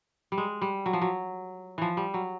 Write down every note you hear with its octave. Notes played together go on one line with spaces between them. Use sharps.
G3
G#3
G3
F#3
F3
F#3
E3 F3
G3
F#3